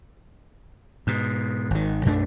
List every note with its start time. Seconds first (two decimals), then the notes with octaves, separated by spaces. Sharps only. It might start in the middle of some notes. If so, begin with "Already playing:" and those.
1.07 G#2 B2
1.71 G#1 D#3
2.05 B1 F#2 A3 D4